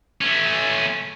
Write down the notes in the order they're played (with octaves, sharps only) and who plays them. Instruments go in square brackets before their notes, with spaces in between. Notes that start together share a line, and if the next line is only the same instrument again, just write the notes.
[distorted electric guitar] A3 C#4